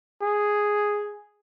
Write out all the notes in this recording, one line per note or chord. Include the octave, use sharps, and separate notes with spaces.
G#4